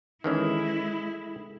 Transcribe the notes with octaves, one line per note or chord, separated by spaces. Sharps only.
D#3 E3 G#3 C#4 E4 G#4 A4 D#6